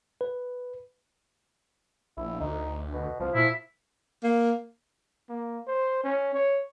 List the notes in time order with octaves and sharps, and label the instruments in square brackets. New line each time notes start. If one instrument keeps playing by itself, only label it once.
[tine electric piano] B4
[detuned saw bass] A#1 [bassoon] E4
[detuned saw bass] D2 [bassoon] D#4
[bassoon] B2
[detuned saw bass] C2 [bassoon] F3
[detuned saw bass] A#2 [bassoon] F3 [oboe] E4
[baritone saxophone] A#3
[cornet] A#3
C5
C#4
C#5